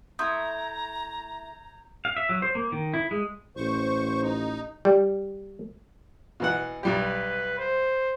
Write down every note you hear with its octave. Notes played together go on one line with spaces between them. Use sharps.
A3 E4 A#5 C6 D#6 G6 G#6
F5
E5
F#3
C5
A#3
D#3
E4
G#3
A1 C5 C#6
D#4
G3
B2 E3 F#5
B1 G3 G4 B4
C5